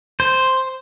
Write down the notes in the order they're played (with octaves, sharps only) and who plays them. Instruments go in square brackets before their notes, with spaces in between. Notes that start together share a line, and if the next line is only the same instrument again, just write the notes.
[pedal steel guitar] C5